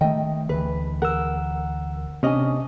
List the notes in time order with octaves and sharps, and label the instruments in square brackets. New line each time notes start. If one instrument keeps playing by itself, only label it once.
[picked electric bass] D#3 A3 [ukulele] D#5 G5
[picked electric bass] D2 E3 [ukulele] B4
[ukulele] A#4 [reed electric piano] F#5 E6
[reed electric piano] C3 D#5 [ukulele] C#4 D4 G#5